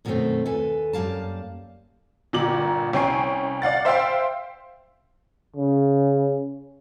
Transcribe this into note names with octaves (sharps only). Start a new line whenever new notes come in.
F#2 B2 D#3 G#3 A3 C4
D#2 A4 B4 G#5
F#2 G3 A#3 F5 A5
G1 A#2 A#5 D6 F#7
C2 C#4 G5 G#5 C#6 C7
D5 F5 F#5 A6
C5 E5 F5 G5 C6
C#3